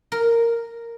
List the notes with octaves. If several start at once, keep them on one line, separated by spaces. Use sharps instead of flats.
A#4